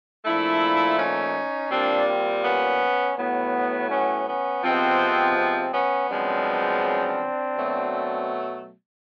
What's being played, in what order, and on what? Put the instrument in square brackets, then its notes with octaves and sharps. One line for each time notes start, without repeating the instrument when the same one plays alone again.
[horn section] A#2 F3 A3 D4 E4
C#4 D#4
A#2 G3 A#3 C4 D4
C4
B3 C#4
A2 F#3 B3
B3 C#4
B3 C#4
C3 F3 G#3 B3 C4
C4
B3 C#4
F#2 C#3 F3 G#3 B3 C4 D4
B2 F#3 A3